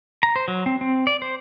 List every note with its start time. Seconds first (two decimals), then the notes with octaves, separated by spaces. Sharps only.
0.23 A#5
0.36 C5
0.48 F#3
0.66 C4
0.81 C4
1.07 D5
1.22 C5